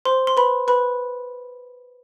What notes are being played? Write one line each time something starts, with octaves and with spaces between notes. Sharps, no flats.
C5 C6
C6
B4 B5
B4 B5